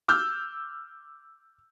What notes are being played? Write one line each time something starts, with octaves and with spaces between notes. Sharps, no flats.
D6 E6 F6 G6